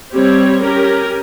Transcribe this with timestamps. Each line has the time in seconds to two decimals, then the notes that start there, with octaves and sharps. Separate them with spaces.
0.13 G3 C4 G4 C#5
0.62 C#4 G4 A#4